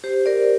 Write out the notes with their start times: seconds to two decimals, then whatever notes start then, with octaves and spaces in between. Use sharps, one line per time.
0.04 G4 C5
0.26 A#4 D5